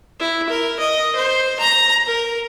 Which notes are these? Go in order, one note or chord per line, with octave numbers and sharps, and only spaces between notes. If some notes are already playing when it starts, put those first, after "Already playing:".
E4
A#4
D#5
C5
A#5
A#4